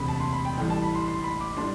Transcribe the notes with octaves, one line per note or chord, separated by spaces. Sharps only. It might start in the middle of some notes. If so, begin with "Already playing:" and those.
Already playing: E1 D2 C3 B5
A5
C6
B5
G5
A1 A2 G3 G5
A5
B5
C6
C6
B5
D6
A2 G3 D4 C6